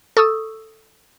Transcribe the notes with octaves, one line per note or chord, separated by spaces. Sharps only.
A4 C#6 D#6 E6